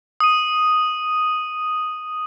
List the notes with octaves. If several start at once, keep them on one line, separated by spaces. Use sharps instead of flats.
D#6 D#7